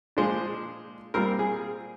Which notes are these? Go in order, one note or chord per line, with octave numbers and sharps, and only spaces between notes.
A#2 F3 G#3 D4 C5
A#2 G3 C4 A#4
G#4